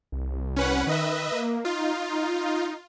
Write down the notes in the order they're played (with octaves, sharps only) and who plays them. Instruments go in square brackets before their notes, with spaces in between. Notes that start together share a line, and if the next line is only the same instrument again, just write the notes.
[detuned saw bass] C2
[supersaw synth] C#4 B4 F#5
[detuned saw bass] D#3 [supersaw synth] B4 D#5 E5
[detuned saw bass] A#3
[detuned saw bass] D#4 [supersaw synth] F4